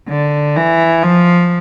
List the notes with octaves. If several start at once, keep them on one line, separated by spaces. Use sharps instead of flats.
D3
E3
F3